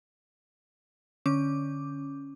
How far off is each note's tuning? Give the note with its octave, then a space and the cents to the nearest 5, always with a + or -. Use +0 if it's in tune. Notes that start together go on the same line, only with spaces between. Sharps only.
D3 +0 C#4 +0 D6 +0